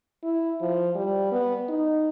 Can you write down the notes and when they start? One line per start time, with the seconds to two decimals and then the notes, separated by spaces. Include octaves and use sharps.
0.23 E4
0.61 F3
0.95 G3
1.32 B3
1.69 D#4